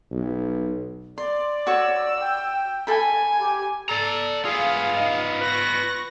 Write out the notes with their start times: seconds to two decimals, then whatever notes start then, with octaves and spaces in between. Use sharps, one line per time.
0.11 B1
1.18 D5 C6
1.67 F#4 C#5 C#6 E6
2.20 G5
2.87 A4 G#5 B5
3.40 G4
3.89 A4 D5 A#5
4.45 B3 F4 G#4 F5
4.96 D#4
5.41 B4 C#6 A#6